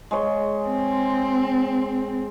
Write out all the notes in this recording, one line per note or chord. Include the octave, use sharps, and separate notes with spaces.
G#3 C#5 C6
C4